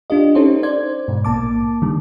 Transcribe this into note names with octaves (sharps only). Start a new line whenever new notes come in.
D4 F4 G4 D#5
C#4 D#4 G4 A4 C5 C#5
C5 D5 G#6
G#2 B2
A#1 A#3 A5 D6
D3 D#3 G3